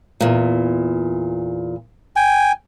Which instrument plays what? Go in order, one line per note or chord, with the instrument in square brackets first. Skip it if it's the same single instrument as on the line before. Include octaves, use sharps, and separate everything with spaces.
[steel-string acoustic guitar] E2 A#2
[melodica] G5 G#5